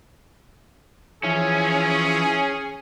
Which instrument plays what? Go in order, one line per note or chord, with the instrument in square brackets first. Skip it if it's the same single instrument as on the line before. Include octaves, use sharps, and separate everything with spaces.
[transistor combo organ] E3 F3 [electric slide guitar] C#4 [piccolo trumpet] G#4